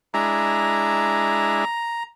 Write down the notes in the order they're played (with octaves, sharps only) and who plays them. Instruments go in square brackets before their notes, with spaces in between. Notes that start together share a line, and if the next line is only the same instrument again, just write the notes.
[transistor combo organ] G#3 D4 E4 [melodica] A#5